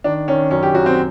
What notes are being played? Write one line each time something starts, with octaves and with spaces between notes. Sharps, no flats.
D#3 D4
D#3 C#4
F#2 C#4
G4
F#2 F#4
C4